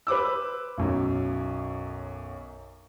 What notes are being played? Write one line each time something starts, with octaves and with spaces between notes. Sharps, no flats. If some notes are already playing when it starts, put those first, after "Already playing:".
B4 C5 D6 E6
B1 F#2